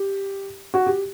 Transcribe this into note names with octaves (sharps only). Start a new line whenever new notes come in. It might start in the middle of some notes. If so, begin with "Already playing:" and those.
Already playing: G4
F#4
G4